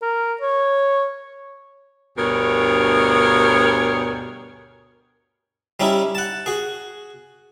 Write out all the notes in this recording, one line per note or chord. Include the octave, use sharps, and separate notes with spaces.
A#4
C#5
D2 G2 B2 G#4 A#4 C#5
G3 C#4 D#4 E4
F#5 A5
F#4 G#4